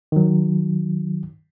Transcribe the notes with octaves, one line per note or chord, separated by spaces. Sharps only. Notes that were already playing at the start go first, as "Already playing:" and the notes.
D#3 F#3